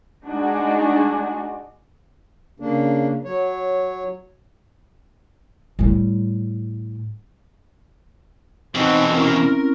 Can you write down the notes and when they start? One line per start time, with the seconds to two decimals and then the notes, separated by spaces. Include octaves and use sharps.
0.25 G#3 D4 D#4 F#4 G#4
2.60 C#3 A#3 D4
3.25 F#3 C#5
5.79 A2 G3
8.75 E2 B2 C4 D#4 D#5 F#5 A5
9.11 C4 C#4 E4 A#4